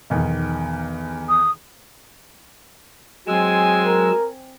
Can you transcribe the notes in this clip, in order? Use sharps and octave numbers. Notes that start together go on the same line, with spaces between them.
B1 E2 D#3
D#6
F#3 G#3 C4 G#5 E6
A#4